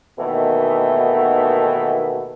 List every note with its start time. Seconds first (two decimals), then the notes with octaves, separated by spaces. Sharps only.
0.18 D#2 B2 D#3 E3 A3 B3